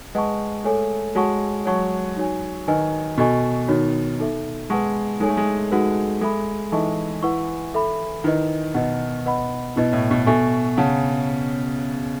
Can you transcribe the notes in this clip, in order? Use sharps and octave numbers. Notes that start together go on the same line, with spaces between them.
G#3 B4 D#5 F#5 A5 C#6
A3 A4 C#5 G#5
G#3 F#4 C#5 F#5 A5 C#6
F#3 C#5 F#5 A5 C#6
D#4 F#4 C#5 G#5
D#3 B4 D#5 G#5
B2 F#4 A4 D#5 G#5 C#6
D#3 D#4 F#4 C#5
D#4 A4 E5
G#3 B4 F#5 A5 C#6
G#3 D#4 A4 C#5 G#5
A3
G#3
G#3 D#4 F#4 B4 F#5
G#3 A4 E5 B5
E3 D#4 A4 D#5 A5 C#6
E4 B4 F#5 C#6
A4 E5 B5
D#3 E4 B4 D#5
B2 B4 D#5 F#5
B4 D#5 F#5 B5
B2 E4 B4 D#5
A2
B2
B2 A4 E5 G#5 C#6
C#3 C#5 F#5 A5